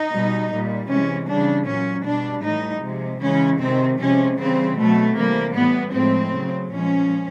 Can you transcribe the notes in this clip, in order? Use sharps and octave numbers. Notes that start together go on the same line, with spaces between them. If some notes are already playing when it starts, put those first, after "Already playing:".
Already playing: D#4
B2 G3
A#2 G3
C3 E3 G#3 C#4
C#3 E3 G3 D4
A#2 F#3 C#4
B2 G3 D4
A2 E3 G3 D#4
C3 F3 G#3
C#3 E3 G#3 C#4
C3 D#3 G#3 C4
C3 F3 G#3 C#4
C#3 E3 G3 C4
B2 F#3 A3
C3 E3 G3 A#3
A2 E3 G3 B3
A2 F3 G#3 C4
C#3 F#3
A#2 F3 G#3 C#4